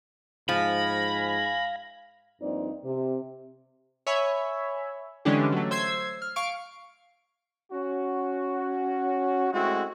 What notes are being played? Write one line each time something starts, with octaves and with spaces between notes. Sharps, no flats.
G#2 F3 F5 G#5 B5 A#6
G2 F3 A#3 C4 D#4 D5
C3
C#5 E5 G#5 B5
D3 E3 G#3 C#4 D4 G4
F#3 A3
C5 E6 G#6 C7
F6
F5 C#6 D7
C#4 F#4
G#3 A3 C4 E4 F#4